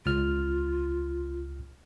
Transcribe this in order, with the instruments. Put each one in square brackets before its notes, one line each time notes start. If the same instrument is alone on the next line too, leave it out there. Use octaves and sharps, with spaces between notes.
[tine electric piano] C#2 F6 [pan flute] F4